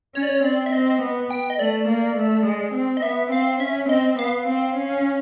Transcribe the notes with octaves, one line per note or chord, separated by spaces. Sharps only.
C#4 C#5
D5
C#5
C4 D5
E5
C4 D#5
B3
G5
D#5
A3 D5
A#3
A3
G#3
C4
D#5
B3 E5
C4 F5
C#4 E5
C4 D#5
B3 F5
C4
C#4